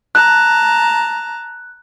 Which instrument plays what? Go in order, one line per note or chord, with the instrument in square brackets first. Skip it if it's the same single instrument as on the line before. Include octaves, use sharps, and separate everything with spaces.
[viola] A5 A#5 [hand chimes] F#6